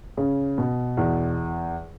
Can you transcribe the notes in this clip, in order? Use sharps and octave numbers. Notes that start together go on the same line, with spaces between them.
C#3
B2
E2